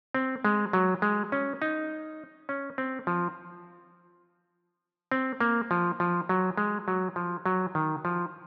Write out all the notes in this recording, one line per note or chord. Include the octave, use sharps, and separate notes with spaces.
C4
G#3
F#3
G#3
C#4
D#4
C#4
C4
F3
C4
A#3
F3
F3
F#3
G#3
F#3
F3
F#3
D#3
F3